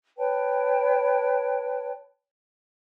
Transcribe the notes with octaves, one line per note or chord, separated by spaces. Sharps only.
B4 C#5 G5 A5